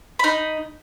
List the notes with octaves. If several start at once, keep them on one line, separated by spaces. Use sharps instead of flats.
D#4 B5